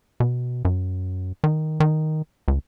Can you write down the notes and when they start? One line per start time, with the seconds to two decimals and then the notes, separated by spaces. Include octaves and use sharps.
0.20 B2
0.65 F#2
1.44 D#3
1.80 D#3
2.48 C#2